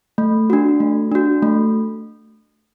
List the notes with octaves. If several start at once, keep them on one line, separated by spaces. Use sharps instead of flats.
A3
D4 F#4
A3
D4 F#4
A3